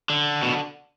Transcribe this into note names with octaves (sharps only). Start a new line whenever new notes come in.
D3
B2